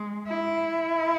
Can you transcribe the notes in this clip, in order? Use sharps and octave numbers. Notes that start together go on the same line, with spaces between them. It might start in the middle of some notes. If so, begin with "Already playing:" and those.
Already playing: G#3
E4